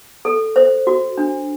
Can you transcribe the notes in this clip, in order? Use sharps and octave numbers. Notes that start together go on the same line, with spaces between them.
A4
C5
F#4
D4